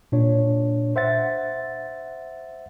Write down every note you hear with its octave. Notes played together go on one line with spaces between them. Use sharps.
A#2 D4 C#5
C5 E5 F#5 A6